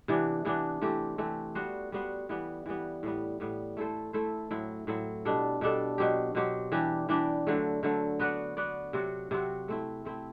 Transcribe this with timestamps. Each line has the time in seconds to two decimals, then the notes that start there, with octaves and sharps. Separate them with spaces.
0.08 C3 E3 B3 D4
0.45 C3 E3 B3 D4
0.82 E3 A3 C4 G4
1.18 E3 A3 C4 G4
1.55 G3 B3 F#4 C5
1.92 G3 B3 F#4 C5
2.29 E3 G3 B3
2.66 E3 G3 B3
3.03 A2 G3 B3
3.40 A2 G3 B3
3.77 A3 E4 A4 C5
4.13 A3 E4 A4 C5
4.51 A2 F#3 C4 E4
4.87 A2 F#3 C4 E4
5.25 B2 G3 D4 A4
5.61 B2 G3 D4 A4
5.98 B2 F#3 C4 G4
6.35 B2 F#3 C4 G4
6.72 E3 G3 D4 G4
7.09 E3 G3 D4 G4
7.47 D3 F#3 A3
7.83 D3 F#3 A3
8.19 B3 F#4 B4 D5
8.57 B3 F#4 B4 D5
8.93 C3 F#3 C4 F#4
9.31 C3 F#3 C4 F#4
9.68 A3 C4 E4
10.05 A3 C4 E4